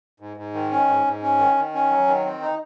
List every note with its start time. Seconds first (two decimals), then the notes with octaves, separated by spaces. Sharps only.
0.20 G#2
0.37 G#2
0.54 D#3
0.71 C#4
0.88 G#2
1.05 G#2
1.22 C#4
1.39 D#3
1.56 D#3
1.74 C#4
1.91 F#3
2.07 D#3
2.25 C4
2.42 D#4